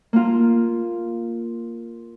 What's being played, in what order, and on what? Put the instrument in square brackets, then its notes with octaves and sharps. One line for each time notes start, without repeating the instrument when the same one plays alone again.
[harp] A#3 F4